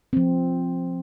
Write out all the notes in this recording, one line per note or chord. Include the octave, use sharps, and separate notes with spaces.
F3 C4